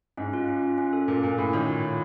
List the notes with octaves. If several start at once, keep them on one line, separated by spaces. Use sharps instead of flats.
G#2 C#4
F4
C#4
F4
C#4
A4
A#2 A4
A#2 C#4
A2 A4
D#3 C#5
F4
C#5